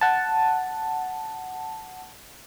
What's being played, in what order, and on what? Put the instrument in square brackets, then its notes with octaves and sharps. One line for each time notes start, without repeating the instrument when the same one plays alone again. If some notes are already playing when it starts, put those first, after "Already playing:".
[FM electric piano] F#5 A5